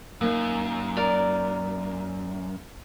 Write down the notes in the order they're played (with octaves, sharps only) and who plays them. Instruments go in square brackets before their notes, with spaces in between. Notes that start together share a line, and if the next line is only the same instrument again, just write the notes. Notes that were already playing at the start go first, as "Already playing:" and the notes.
[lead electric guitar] F#2 [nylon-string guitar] A#3 D#4
[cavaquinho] A#4 D5